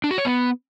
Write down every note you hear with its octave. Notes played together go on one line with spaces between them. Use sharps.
D4
F#4
C#5
B3